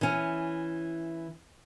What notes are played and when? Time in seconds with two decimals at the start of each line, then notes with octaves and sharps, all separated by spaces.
0.01 E3 C#4